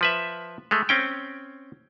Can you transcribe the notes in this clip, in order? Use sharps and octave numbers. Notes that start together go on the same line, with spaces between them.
F3 B4 E5
G#3 A3
C4 C#4 G5